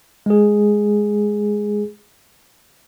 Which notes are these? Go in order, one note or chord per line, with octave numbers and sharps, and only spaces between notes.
G#3 G#4